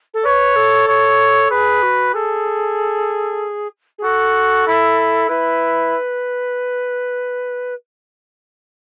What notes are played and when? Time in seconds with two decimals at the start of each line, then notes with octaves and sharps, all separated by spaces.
0.14 A4
0.25 B4 C#5
0.56 A4
0.88 C#5
1.51 G#4 B4
1.83 F#4
2.13 G#4 A4
3.98 G#4
4.04 F#4 A4
4.67 E4
5.29 E4 B4